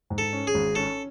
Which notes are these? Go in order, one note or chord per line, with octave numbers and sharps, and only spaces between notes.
G#2
A4
C#4
G#4
G#1
C#4 A4